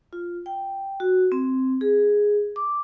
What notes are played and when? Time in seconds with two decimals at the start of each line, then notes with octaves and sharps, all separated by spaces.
0.13 F4
0.46 G5
1.00 F#4
1.32 C4
1.81 G#4
2.56 D6